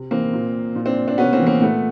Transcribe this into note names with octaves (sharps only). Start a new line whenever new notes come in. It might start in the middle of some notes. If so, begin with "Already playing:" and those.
Already playing: C3
E3 A#3 C4
A#2
A#2
C4 D4
C4 D4
C3 B3 C#4
A#3 C4
E3
A#3 C4
A#2 A3 B3